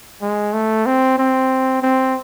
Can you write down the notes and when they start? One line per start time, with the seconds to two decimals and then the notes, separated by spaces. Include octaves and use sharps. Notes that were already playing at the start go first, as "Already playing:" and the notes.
0.22 G#3
0.53 A3
0.86 C4
1.18 C4
1.82 C4